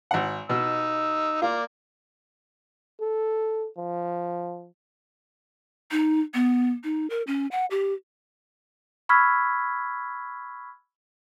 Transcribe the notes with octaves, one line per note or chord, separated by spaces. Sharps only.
G#1 F#5
B2 D#4 E6
A#3 F4 D5 A#5
A4
F3
D#4
B3
D#4
A#4
C#4
F#5
G4
B5 C#6 E6 F6 G#6 B6